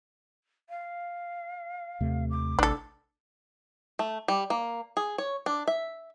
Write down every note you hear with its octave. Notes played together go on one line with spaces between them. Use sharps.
F5
D#2 C3 A3
D6
A1 D4 A4
A3
G3
A#3
G#4
C#5
D4
E5